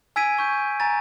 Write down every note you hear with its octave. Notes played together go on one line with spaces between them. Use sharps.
G#5 E6 G#6 B6 D7 D#7
C#6 G6
G#5 A#5 A6